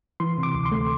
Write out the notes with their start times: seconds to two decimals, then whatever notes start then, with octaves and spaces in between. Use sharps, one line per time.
0.20 E3 C6
0.38 C3
0.43 D6
0.55 D2
0.65 C6
0.72 A3